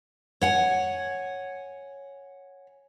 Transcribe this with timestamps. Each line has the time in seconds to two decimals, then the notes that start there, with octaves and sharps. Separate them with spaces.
0.41 C#5 F#5 G#5